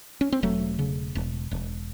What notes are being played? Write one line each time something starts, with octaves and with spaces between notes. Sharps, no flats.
C#4
C4
E1 F#3 A3
C#3
E1
E1